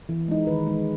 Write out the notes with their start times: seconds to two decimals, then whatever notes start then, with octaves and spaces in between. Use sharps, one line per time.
0.09 E3
0.28 G#3 D#4
0.47 D#3 B4
0.67 G#3 D#4